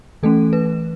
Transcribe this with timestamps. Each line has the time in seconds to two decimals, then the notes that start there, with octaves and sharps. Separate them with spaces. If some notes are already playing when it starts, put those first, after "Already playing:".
0.23 E3 A3 C#4 A4
0.53 B4